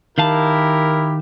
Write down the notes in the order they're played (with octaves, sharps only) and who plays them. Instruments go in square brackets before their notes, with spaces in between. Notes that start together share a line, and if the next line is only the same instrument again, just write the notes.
[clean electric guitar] D#3 F5 A5 [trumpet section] E4 G4 A#4